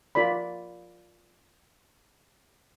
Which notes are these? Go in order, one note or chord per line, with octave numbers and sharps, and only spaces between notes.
F4 A#4 D5 B5